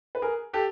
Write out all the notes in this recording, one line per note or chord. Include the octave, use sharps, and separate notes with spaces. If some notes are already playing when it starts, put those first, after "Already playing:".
B4
G#4 A#4
G4 A4